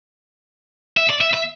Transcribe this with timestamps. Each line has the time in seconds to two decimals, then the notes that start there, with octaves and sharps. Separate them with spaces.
0.97 E5
1.10 D5
1.21 E5
1.34 E5